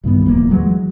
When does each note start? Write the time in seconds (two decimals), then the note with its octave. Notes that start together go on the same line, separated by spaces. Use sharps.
0.04 C2 G2 D#3 B3
0.26 D1 E2 F3 A#3
0.50 E3 F#3 G#3